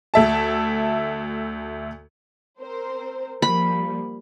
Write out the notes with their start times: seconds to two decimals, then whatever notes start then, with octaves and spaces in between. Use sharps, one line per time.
0.14 D2 E5 A5
2.60 C4 A#4 C5
3.42 F3 G3 A#3 B5